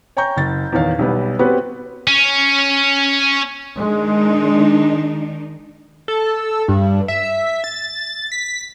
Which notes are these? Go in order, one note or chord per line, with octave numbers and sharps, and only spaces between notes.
C#5 G5 G#5 A#5 C#6 G6
F#1 A6
D#1 E2 D#3 C#5 F5
B1 G3 B3
B3 C4 F#4 G4 B4 C#5
C#4
D#3 G#3 D4 D#4
A4
G2
E5
A6
B6